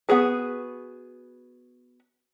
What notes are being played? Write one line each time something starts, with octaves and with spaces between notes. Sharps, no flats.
B3 F#4 G#4 B4